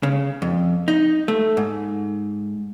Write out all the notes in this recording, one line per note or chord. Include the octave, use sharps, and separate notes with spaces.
C#3
F2
D#4
A3
G#2